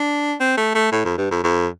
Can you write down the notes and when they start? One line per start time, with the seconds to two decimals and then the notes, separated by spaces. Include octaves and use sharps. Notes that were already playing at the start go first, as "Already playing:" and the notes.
Already playing: D4
0.40 C4
0.57 A3
0.75 A3
0.92 A2
1.05 F2
1.18 G2
1.31 F2
1.44 F2